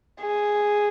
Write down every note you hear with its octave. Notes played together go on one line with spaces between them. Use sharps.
G#4